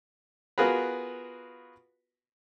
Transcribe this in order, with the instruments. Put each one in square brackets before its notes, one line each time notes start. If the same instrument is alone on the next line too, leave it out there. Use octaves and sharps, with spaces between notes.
[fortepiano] B3 F4 F#4 G#4 A#4 B4